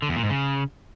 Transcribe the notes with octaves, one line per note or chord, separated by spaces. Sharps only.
D3
E2
A#2
G#2
C#3